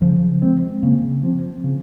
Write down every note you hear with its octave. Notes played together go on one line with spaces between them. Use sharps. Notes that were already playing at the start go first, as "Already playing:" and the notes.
C#3 F3
F3 G#3 C4
C#3 A#3
F3 C4
C#3